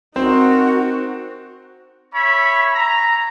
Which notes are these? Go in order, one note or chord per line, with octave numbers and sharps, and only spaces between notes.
C4 D#4 F#4 A#4
C#5 E5 B5
A#5